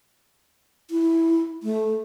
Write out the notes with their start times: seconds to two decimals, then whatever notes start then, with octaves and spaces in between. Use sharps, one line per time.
0.91 E4
1.63 A3